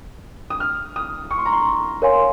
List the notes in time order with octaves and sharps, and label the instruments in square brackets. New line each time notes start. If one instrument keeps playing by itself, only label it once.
[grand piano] D#6
F6
D#6
C#6
C6
A#5
C6
[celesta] A#4 C#5 F5 G#5 C6